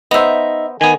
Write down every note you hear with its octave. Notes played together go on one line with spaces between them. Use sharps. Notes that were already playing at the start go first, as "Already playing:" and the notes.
B3 D#4 C5 E5
D#3 B3 G#5